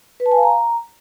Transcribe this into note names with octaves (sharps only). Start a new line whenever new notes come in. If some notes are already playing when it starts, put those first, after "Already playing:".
B4
A5
G#5
F5
A#5